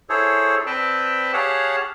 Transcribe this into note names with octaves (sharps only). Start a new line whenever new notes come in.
E4 G#4 A4 C5 C#5
C4 B4 D5 G5 A5
G4 G#4 C#5 F5 F#5 A5